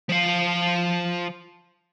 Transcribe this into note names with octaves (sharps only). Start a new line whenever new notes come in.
F3 F5